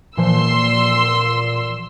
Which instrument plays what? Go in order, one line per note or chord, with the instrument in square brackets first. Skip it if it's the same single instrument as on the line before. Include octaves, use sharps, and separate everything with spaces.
[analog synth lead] A#2 [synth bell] E3 F3 [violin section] C6 E6